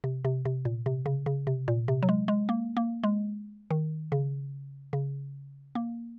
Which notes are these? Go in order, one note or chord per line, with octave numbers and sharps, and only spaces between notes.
C3
C3
C3
A#2
C3
C#3
C#3
C3
A#2
C3
F#3
G#3
G#3
A#3
A#3
G#3
D#3
C#3
C#3
A#3